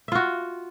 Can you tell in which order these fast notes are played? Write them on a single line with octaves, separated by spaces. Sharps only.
E5 F4 F#4